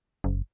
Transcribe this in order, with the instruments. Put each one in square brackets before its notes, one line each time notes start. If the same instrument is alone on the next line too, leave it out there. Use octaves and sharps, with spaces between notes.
[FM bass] F#1